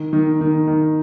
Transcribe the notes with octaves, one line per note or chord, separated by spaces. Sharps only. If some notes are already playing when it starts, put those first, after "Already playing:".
Already playing: D#3
D#3
D#3
D#3